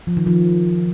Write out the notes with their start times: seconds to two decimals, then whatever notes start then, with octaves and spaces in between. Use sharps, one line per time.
0.07 F3
0.17 D#3
0.27 F3